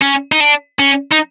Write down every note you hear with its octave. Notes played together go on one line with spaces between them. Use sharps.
C#4
D#4
D4
C#4
D#4